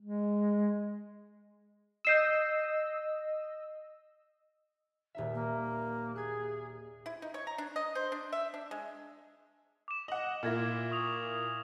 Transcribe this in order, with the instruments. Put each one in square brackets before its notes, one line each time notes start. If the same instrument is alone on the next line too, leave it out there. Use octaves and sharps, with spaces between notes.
[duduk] G#3
[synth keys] D#5 E6 [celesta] G6 C7 E7
[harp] D#1 D#4 E5
[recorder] A#3
[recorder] G#4 [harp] F#6 G#6
[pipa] E4
D#4
C#5
A#5
D4
D#5
C5
D4
E5
D4
G#3
[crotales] D6 E7
[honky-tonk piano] D#5 F#5 [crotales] F#7
[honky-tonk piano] A#2 A#3 E4 [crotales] F6 G#6 A#6
[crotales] C#6 D#6 F7